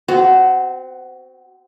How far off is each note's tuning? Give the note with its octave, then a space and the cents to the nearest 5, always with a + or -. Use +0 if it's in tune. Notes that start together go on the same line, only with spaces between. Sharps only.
C4 -20 F#4 +15